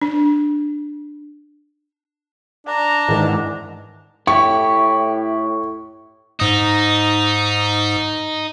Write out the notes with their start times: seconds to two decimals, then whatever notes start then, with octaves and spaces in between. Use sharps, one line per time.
0.02 D4
2.67 D4 A#5
3.08 G#2 D#3 E3
4.27 A2 E4 G4 C#6
6.40 G#2 D#4 D#6